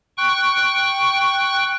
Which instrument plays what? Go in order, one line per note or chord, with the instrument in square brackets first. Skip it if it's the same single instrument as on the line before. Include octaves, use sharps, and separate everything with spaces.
[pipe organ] G5 C#6 F#6